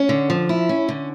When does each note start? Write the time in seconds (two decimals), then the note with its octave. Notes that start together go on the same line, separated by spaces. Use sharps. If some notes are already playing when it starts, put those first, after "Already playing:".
Already playing: C#4
0.09 D3
0.30 F3
0.49 E4
0.69 C#4
0.88 D3